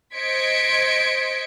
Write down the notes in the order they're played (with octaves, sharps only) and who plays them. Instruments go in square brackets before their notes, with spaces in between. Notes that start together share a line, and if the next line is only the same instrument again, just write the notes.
[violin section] C5 D#5 G#6 B6 C#7 D7